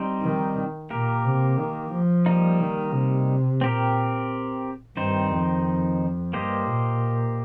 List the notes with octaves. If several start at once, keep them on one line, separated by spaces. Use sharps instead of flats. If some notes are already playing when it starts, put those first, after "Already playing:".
Already playing: G3 C4 D#4 C5
D#3
A#2 A#3 G4 A#4
C3
D#3
F3
G3 A#3 D#4
D#3
C3
A#2 C4 G4 A#4
G2 D#3 C4 D#4 C5
F2
G2 A#3 G4 C5 D#5
A#2